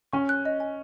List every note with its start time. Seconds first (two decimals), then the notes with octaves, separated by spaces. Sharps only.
0.13 C#4 C#6
0.29 F#6
0.45 D#5
0.60 G#5